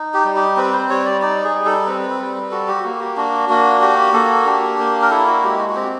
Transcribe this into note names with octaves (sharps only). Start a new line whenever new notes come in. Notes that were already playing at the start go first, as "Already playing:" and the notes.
Already playing: D#4
G4
G3
G4
C4 B4
C5
G3 C#5
D5
D#4 D5
G#4
G3
A4
C4 B4
G3
F#4 A4
G4
A#3 F#4
G4
D4 F#4
A#3 F#4
F#4 G4
A#3 A4
D4 G4
A#3
A#4
E4 A4
F#4
G#3 G4
F#4
F#4
C4 G4